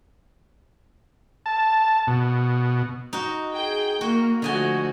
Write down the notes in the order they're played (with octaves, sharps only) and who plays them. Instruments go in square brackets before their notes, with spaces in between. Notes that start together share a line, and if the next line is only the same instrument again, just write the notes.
[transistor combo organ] A5
B2
[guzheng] D#4 F#4
[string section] G#4 G5
[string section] A#3 [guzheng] F#4
[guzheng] D3 D#5 G#5 [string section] F3 A3 F#4